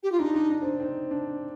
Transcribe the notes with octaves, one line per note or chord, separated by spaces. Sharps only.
G4
F4
D4 D#4
D4
D4
C4
D4
C4 D#4
D4